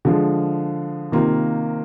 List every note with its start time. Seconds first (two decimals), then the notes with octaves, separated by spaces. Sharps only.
0.05 D3 F3 G#3
1.12 C3 D#3 A#3 F4